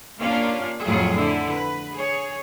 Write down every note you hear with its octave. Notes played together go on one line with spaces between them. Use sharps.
D#2 A#3 C#4 D4 F4 F5
F2 A2 F#3 F4 G#4
D3 E4
B4
G#4 C#5